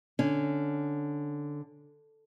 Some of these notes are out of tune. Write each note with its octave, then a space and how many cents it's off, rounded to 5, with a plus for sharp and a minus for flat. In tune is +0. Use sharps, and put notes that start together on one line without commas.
D3 +0 C#4 +0